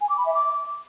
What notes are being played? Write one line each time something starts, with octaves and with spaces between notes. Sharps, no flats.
G#5
D6
B5
E5
D6